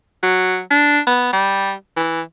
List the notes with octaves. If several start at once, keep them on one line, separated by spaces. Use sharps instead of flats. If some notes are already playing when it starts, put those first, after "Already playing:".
F#3
D4
B3
G3
E3